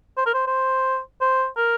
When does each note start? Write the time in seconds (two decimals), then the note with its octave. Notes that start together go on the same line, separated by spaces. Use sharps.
0.17 C5
0.26 A#4
0.34 C5
0.47 C5
1.21 C5
1.57 A#4